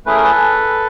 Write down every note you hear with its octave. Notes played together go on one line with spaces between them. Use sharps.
A3 C#4 E4 G#4 B4
A#4
A4 B4